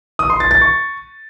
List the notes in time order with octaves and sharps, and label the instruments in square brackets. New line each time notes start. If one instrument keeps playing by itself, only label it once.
[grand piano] D#6
C6
A6
A6
C#6